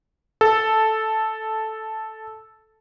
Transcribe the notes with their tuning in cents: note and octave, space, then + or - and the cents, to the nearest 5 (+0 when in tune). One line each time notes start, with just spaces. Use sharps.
A4 -5